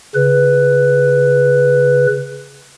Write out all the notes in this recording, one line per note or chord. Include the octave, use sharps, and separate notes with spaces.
C#3 B4